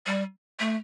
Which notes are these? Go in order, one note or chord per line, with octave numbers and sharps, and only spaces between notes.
G3
A3